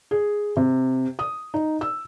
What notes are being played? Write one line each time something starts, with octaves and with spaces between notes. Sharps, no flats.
G#4
C3
D#6
D#4
E6